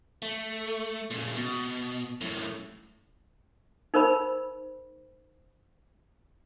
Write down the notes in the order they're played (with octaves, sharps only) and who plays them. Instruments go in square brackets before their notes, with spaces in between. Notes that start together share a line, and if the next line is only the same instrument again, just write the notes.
[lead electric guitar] A3
A#2 C#3
B2
F#2 A2
[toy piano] D#4 A#4 C5 B5